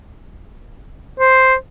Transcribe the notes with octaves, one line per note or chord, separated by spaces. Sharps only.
C5